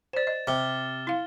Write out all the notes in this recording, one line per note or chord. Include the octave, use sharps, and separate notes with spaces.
C5 D5 A6 E7
D#5
C3 F6 G7
E4 F5